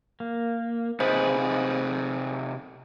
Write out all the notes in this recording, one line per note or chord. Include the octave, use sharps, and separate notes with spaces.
A#3
C3 D#4 F4 G#4 B4 C5